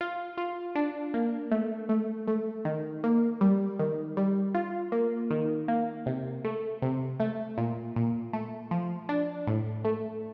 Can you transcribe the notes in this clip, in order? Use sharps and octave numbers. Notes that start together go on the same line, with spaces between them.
F4
F4
D4
A#3
A3
A3
A3
D#3
A#3
G3
D#3
G3
F4
A#3
D#3
A#3
C3
A3
C3
A3
A#2
A#2
A3
F3
D4
A2
A3